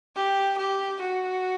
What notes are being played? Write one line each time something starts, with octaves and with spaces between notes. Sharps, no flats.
G4
G4
F#4